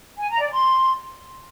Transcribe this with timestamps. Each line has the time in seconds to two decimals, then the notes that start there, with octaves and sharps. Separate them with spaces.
0.19 G#5
0.30 A#5
0.41 D5
0.52 C6